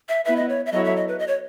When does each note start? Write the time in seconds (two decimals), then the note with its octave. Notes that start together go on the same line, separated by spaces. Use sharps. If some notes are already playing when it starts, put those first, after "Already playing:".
0.09 E5
0.25 B3 E4 B4 E5
0.36 D#5
0.49 C#5
0.66 E5
0.72 F#3 B3 E4 A4 C#5 D#5
0.84 E5
0.96 D#5
1.08 B4
1.19 D#5
1.27 C#5